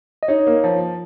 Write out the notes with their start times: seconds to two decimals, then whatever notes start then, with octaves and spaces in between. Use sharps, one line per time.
0.23 D#5
0.28 D#4 C#5
0.47 A#3
0.64 F3